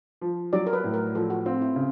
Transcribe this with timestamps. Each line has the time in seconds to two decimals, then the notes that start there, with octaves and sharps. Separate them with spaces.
0.21 F3
0.53 F#3 D5
0.67 A#4
0.73 B4
0.84 A2
0.94 A#4
1.15 F3 A4
1.30 F#4
1.46 C4 F4
1.61 E4
1.76 C#3